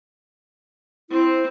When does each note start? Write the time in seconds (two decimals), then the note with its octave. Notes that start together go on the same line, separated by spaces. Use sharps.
1.10 C4 E4 C5